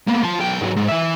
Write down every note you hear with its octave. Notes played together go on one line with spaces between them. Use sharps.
A#3 B3
F4 A5
B1 G5
G#2 F#3
G#2
E3 E5